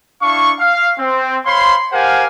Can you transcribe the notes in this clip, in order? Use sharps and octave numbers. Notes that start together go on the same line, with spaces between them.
D4 E4 F5 C#6
F5
C4
C5 C#5 F5 B5 C6
G4 A#4 C5 F5 F#5 G#5